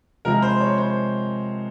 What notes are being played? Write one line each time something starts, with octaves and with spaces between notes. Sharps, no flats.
C3 F3 G#3 A#4
C5
C#5
C5